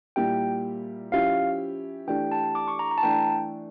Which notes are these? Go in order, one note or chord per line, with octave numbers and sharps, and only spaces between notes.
A#2 G3 A#3 E4 G4 G5
F3 C#4 E4 G4 F5
E3 A3 D4 G4 G5
A5
D6
C#6
A#5
A#5
A5
E3 A3 D4 G5